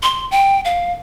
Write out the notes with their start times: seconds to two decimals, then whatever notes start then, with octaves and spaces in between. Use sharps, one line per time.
0.03 C6
0.31 G5
0.65 F5